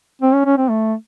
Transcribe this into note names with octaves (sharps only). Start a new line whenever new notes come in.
C4
C#4
C#4
C4
A3